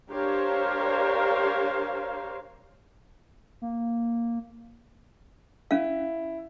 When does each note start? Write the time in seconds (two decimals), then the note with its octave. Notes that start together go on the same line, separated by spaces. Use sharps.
0.11 D4 G4 A#4 C5 C#5 F5
3.62 A#3
5.71 C#4 E4 F5